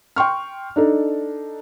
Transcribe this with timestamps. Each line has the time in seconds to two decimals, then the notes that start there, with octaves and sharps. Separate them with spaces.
0.16 G5 C6 C#6 F6
0.76 D4 D#4 A4